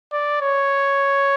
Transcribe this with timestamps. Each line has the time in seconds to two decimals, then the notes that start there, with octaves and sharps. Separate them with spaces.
0.12 D5
0.41 C#5